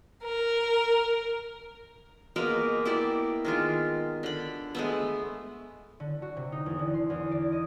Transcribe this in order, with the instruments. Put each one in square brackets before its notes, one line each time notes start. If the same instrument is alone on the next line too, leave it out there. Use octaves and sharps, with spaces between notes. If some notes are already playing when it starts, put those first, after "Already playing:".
[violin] A#4
[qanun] B2 G#3 A#3 A#4
E4 G4 D5
D#3 G#3 F4
D3 B5
G#3 A3 B3
[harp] D3
F#4
C3
D#4
E2
D3
C6
E2
D5
D#5